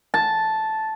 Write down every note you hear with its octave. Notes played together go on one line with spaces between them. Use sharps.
A5